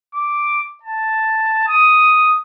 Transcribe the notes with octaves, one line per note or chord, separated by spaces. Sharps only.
D6
A5
D#6